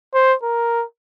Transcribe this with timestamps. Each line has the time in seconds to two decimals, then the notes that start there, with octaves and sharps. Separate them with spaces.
0.14 C5
0.43 A#4